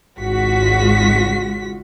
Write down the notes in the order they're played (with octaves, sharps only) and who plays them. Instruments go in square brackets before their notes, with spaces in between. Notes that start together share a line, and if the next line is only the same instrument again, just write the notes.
[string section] G#1 C#2 G#3 F4 F#4 B6